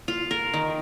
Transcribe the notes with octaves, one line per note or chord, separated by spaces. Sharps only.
F4
A#4
D#3